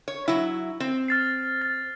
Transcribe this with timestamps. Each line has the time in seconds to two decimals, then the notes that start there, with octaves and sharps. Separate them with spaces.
0.08 C#5
0.28 F#3 E4
0.80 C4
1.08 F6 A6 C7
1.62 A6